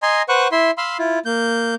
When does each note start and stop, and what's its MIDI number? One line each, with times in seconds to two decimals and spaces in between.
0.03 0.22 75
0.03 0.22 80
0.03 0.22 82
0.03 0.22 84
0.29 0.48 71
0.29 0.48 72
0.29 0.48 78
0.29 0.48 85
0.29 0.48 90
0.52 0.71 64
0.52 0.71 76
0.52 0.71 84
0.78 0.97 77
0.78 0.97 83
0.78 0.97 84
0.78 0.97 88
0.99 1.19 64
0.99 1.19 65
1.25 1.75 58
1.25 1.75 91